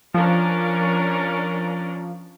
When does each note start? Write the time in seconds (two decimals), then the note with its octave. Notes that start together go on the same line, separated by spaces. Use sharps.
0.14 F3 C#4 D4 A#4